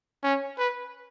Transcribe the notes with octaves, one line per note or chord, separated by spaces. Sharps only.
C#4
B4